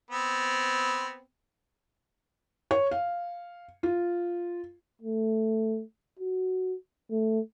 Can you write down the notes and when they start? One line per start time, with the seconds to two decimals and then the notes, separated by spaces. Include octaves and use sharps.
0.11 B3 C4
2.71 C#5
2.91 F5
3.83 F4
5.02 A3
6.19 F#4
7.11 A3